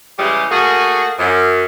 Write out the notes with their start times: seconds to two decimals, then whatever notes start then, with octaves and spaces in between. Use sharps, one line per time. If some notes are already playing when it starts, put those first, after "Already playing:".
0.18 C#3 E3 G3 G#3 G4
0.50 A3 A#3 F#4 G#4
1.18 F#2